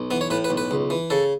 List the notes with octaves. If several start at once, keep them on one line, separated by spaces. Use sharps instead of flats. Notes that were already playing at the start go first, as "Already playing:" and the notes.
Already playing: B1
E3 B3
C#5
A2 B4
B4
B1
B4
C#2
E3
C#3 A4